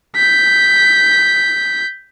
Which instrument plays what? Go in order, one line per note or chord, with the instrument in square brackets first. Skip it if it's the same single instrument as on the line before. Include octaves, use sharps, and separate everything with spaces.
[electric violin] G6 B6